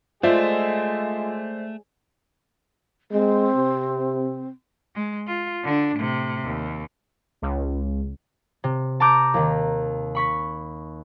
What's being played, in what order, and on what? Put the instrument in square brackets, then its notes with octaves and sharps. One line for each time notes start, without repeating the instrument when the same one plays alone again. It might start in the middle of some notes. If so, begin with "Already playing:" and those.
[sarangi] G#3 [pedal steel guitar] A3 [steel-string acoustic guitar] F4 [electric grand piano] C5 D5 E5
[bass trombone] G#3 [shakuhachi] C4
[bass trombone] C3
[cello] G#3
F4
D3 D4
A2 C3
D#2
[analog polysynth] C#2
[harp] C3
A5 A#5 D6 G6
D#2 D#3
B5 C#6 B6